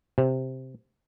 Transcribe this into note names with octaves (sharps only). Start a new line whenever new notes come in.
C3